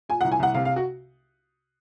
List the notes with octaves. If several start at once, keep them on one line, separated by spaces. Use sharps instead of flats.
A#2 G#5
F#5
C2
G#5
C2 F#5
C3 F5
F5
F#4